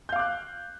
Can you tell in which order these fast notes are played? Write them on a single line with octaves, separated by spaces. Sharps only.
G6 F5 D6 F#6